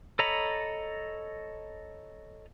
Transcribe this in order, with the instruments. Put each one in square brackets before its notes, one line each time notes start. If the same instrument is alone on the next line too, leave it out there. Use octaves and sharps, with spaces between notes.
[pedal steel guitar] A4 C#5 D#5 A#5 B5